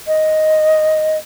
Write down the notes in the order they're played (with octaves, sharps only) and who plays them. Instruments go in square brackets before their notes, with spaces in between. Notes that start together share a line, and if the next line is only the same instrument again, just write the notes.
[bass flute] D#5